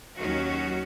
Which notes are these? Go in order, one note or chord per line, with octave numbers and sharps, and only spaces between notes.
D#2 D#3 F#3 C#4 F#4